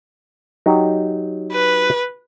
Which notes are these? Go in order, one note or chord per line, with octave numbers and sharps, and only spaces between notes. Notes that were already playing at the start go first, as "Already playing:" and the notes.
F#3 D#4 G4
B4